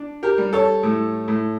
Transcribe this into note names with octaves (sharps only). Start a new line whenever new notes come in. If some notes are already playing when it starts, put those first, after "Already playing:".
Already playing: D4
G4 A#4
G3
A4 C#5
A2
A2